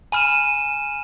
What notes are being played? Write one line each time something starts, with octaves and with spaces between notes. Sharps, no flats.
G#5 B5 F6 D#7 E7